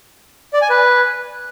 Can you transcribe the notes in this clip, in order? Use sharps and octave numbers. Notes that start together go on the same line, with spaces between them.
D5
G#5
B4